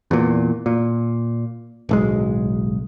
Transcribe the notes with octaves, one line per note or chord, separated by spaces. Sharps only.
E2 A#2
A#2
D1 B1 G#3